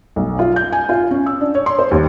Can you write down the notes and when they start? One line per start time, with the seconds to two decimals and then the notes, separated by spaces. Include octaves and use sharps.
0.16 B1
0.39 F4
0.56 G6
0.72 G#5
0.89 F4
1.11 C#4
1.26 E6
1.41 D4
1.55 C#5
1.66 C6
1.79 C5
1.91 D#2